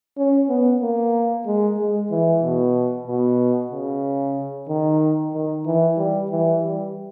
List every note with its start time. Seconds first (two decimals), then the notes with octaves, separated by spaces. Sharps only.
0.17 C#4
0.49 B3
0.81 A#3
1.46 G#3
1.78 G#3
2.11 E3
2.43 B2
3.08 B2
3.72 C#3
4.69 D#3
5.34 D#3
5.66 E3
5.98 G3
6.30 E3
6.63 G3